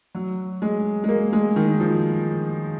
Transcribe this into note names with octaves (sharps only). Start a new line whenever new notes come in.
F#3
G#3
G#3
A#3
G#3
D#3
F3